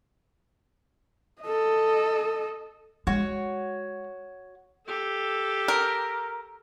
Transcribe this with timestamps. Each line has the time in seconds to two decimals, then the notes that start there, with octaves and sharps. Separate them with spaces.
1.42 A4 D#5
3.07 G#3 F#4 C#5
4.86 G4 A4
5.68 A#4